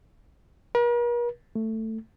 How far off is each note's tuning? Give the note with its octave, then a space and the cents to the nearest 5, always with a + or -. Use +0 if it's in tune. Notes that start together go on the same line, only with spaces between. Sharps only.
A#4 +45
A3 +10